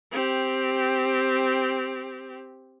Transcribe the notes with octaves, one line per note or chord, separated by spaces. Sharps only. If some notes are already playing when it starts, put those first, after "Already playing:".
C4 G4